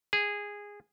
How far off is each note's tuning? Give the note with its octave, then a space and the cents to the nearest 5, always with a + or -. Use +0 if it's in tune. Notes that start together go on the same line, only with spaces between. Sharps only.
G#4 -15